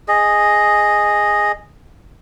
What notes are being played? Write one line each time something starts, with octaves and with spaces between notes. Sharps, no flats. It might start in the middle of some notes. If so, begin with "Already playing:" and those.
G#4 D#5